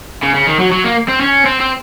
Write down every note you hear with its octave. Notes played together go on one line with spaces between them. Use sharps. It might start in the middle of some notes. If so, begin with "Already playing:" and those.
C#3
C#3
D#3
F#3
F#3
A#3
C4
C#4
C4
C4